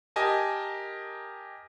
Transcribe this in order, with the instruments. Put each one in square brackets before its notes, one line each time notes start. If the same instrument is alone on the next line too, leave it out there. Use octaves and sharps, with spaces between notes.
[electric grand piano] G4 A#4 D#5 G#5 A5